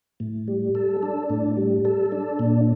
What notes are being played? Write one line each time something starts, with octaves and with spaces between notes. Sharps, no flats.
A2
G3
A4
D4
A2
G3
A4
D4
A#2